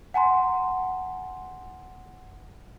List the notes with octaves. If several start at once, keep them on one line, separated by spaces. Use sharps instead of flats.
F#5 G#5 A#5 C6